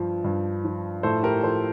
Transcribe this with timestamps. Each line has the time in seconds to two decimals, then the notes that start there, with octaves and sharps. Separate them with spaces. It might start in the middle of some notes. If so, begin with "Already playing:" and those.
Already playing: G2 F3
0.24 G2
0.65 F3
1.03 A2 A4 C5
1.23 G4 A#4
1.43 F3 A4 C5